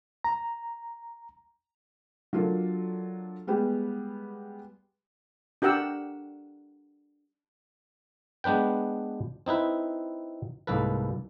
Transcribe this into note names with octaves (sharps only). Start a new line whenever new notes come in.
A#5
F#3 D4 F4 A4 A#4
G3 G#3 B3 G4
D4 G4 A#4 F#5 E6
G#3 B3 D4 B4 G5
C4 D#4 E4 B4
C2 G#2 A#3 A4 B4